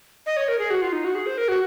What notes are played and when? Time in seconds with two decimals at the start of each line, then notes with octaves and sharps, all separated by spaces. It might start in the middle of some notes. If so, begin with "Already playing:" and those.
0.26 D#5
0.37 C#5
0.48 A#4
0.59 G#4
0.70 F#4
0.82 F4
0.93 D#4
1.04 F#4
1.15 G#4
1.26 C5
1.38 A#4
1.48 F#4